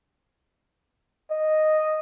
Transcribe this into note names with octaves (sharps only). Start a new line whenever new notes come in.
D#5